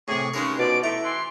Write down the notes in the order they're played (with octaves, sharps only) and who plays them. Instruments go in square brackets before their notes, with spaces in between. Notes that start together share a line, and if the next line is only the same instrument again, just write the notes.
[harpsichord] A2 C3 [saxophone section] G#4 [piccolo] C#6
[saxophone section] G2 C#3 G#3 [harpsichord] C#4 D#4 A#4
[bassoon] B2 [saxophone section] F3 D5 [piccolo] D7
[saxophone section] A3 [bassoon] E4 [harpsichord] A#5 [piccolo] D7
[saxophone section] E3 [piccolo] C6